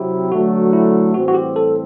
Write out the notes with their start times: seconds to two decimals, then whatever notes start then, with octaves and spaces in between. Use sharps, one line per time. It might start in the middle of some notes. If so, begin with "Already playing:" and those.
Already playing: C3 F#3 C4 E4 F#4 G4
0.32 D3 F#3 A3 F#4
0.73 E4
1.14 A2 E3 G3 C4 F#4
1.28 F#4
1.34 G4
1.56 A4